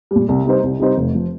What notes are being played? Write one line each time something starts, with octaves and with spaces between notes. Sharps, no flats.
A#2 G3
C2
C3 G3 D#4 C5
C2
C3 G3 D#4 C5
F1
F3